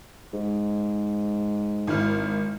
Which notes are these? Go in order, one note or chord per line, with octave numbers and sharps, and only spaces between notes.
G#2
G#1 E4 F6